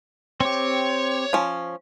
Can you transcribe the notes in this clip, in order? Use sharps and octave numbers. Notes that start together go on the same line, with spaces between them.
C4 G4 C#5
F3 C#4